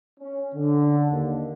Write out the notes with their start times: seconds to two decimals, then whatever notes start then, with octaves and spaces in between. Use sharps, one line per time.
0.20 C#4
0.55 D3
1.11 D#2